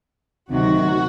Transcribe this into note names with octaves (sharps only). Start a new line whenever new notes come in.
D2 C3 D#3 F#3 F#4